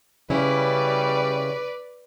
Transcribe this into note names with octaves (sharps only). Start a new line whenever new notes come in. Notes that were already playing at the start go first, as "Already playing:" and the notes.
C#3 G3 C#4 E4 B4 D5